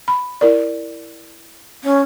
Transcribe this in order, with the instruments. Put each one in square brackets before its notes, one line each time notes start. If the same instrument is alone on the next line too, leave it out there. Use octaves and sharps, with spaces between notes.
[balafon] B5
E4 A#4 D5
[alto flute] C#4